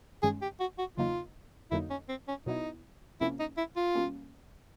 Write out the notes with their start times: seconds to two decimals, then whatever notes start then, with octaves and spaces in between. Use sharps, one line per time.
0.23 G2 D#3 G#3 C#4 G#4
0.42 G4
0.60 F#4
0.78 F#4
0.97 E2 C#3 F#3 A#3 D#4 F4
1.71 F2 D3 F#3 A#3 D#4 E4
1.90 C#4
2.09 C4
2.28 C#4
2.46 B2 F#3 B3 D#4 E4
3.21 F2 C3 F3 A#3 C#4 E4
3.40 D#4
3.57 E4
3.77 F4
3.95 B2 G3 A#3 C#4